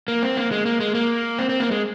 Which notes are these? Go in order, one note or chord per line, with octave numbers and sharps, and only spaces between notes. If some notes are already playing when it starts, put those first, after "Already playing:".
A#3
C4
A#3
G#3
A#3
G#3
A#3
C4
C4
A#3
G#3